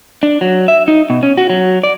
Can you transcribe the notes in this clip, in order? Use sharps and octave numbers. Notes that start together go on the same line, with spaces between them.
D4
F#3
E5
D#4
B2
C#4
F#4
F#3
D5